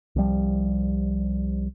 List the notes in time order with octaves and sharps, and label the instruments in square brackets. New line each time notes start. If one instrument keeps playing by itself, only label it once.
[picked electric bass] C2 F3 G3